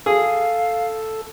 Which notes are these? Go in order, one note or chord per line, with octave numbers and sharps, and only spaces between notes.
G#4 A4 F5